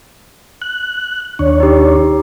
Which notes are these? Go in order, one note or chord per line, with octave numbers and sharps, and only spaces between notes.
F#6
D#2 D4 C#5
D#4 G4